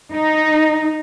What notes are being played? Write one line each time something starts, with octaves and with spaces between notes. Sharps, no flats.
D#4